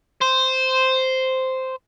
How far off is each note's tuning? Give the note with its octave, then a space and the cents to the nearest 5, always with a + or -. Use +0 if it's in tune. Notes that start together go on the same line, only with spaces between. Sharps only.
C5 -5